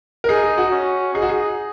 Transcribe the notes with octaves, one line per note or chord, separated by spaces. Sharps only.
A#4
D#4 G#4
G#4
F#4
C#4
D#4 G#4
F#4
G#4